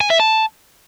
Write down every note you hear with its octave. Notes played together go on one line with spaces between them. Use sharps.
G#5
E5
A5